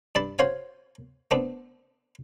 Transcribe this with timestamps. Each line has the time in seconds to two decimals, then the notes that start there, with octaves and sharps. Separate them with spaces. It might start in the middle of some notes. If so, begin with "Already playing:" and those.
0.15 G2 D5 A5 B5
0.39 F#4 C5 C#5 F5 G#5
1.31 A3 B3 C4 D4